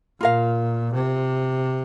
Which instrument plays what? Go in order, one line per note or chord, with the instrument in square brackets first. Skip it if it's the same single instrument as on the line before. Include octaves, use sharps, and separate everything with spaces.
[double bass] A#2 [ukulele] F4 A#4 F5
[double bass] C3